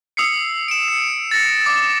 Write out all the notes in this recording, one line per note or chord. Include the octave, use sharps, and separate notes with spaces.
D#6 E6 C7 C#7
D7 E7
C#7
A6 A#6 C#7
D6